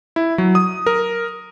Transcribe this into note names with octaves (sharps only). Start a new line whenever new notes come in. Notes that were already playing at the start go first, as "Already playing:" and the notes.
E4
F#3
D#6
A#4